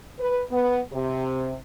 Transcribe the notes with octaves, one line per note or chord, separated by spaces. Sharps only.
B4
B3
C3